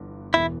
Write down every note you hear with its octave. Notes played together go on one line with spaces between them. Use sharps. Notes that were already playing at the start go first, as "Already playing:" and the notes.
Already playing: G1 G2 E3 B3
E1 E2 E3 E4